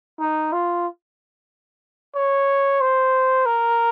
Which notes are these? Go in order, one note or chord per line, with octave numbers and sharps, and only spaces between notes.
D#4
F4
C#5
C5
A#4